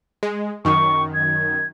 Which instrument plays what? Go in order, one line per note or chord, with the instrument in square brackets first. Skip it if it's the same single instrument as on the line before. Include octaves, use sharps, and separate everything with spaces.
[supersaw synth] G#3
[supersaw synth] F#2 D#3 [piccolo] C#6
[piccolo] G#6